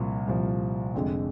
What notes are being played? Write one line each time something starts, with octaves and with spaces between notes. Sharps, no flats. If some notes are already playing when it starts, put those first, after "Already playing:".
Already playing: C2 A#2 F3
C2 A#2 F3
F1 F2 D3 G#3